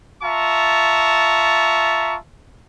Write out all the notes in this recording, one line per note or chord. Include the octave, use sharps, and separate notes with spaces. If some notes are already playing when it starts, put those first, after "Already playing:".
F4 E5 A5 A#5 C#6